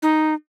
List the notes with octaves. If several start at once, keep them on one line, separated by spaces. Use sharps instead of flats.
D#4